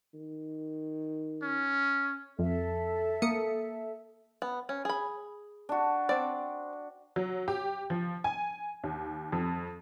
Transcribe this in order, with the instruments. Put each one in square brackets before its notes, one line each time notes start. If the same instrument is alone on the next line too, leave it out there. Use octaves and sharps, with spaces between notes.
[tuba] D#3
[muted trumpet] C#4
[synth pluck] F2 [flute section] A4 E5
[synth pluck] A#3 D#6 C#7
[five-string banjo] B3
C#4
G#4 B5
[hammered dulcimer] D4 F#4
[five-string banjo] C4 D5
[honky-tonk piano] F#3
G4
F3
G#5
D#2
F2